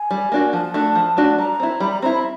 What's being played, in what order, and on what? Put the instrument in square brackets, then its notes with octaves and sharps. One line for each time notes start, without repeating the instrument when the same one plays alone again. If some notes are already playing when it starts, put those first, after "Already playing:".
Already playing: [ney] G#5
[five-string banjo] G3
A#3 D4 F#4
[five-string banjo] F3 [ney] A5
[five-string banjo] A3 D4 F#4
F3
A3 D4 F#4
[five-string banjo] G3 [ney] A#5
[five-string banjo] C4 E4
[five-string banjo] G3 [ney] B5
[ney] A#5
[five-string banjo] C4 E4 [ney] A#5
[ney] B5